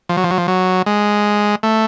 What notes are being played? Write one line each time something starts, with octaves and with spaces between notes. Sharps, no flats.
F3
F#3
F3
F#3
F3
F#3
G#3
A3